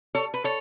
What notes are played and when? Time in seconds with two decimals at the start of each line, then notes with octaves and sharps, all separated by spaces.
0.15 A4 C#5
0.34 B4
0.44 A4 C#5